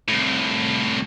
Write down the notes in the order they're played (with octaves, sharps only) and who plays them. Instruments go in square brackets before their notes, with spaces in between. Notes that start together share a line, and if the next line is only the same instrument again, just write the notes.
[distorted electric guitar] C2 A2